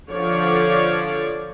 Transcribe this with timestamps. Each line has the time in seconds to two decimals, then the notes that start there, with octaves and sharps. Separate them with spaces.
0.10 D3 F3 C#5 D5